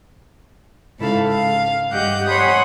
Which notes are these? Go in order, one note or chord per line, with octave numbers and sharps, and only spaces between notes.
G#2 C#3 E4 A4 F5
F5
G2 G4 D#5 F#5 G6
C#5 F#5 G#5 B5 C6 D#6